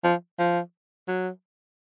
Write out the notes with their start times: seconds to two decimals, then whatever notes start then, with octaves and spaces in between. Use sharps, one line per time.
0.04 F3
0.39 F3
1.08 F#3